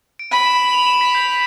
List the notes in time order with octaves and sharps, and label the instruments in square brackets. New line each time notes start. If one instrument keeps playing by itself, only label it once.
[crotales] D7
[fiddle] B5 [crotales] D#7
[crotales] E7
F#7
F7
E7
B6
G6